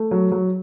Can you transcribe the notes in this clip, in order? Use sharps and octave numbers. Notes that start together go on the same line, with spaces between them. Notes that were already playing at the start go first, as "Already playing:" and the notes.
Already playing: A3
F#3
F#3